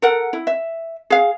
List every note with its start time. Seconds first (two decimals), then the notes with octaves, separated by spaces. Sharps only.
0.02 A4 A#4 F#5
0.33 E4
0.47 E5
1.10 G#4 F5